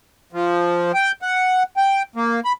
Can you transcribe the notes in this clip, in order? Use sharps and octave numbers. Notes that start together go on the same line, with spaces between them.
F3
G5
F#5
G5
A#3
B5